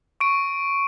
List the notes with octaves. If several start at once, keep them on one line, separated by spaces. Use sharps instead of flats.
C#6 D7